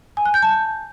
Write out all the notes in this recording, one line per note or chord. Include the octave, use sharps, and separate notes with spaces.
G#5
F#6
G6
A5